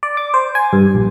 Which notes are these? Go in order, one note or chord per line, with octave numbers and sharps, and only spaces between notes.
D5
D6
C5
G#5
G2
A#1